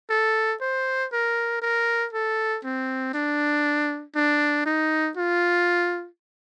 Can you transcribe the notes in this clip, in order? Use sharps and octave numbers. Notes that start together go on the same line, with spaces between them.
A4
C5
A#4
A#4
A4
C4
D4
D4
D#4
F4